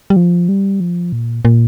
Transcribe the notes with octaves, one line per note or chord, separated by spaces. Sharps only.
G3
F3
G3
F3
A#2
A#2